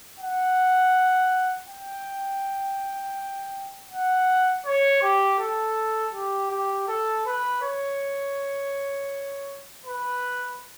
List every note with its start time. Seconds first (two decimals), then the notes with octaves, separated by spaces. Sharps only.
0.19 F#5
1.68 G5
3.90 F#5
4.65 C#5
5.02 G4
5.39 A4
6.13 G4
6.51 G4
6.88 A4
7.26 B4
7.62 C#5
9.85 B4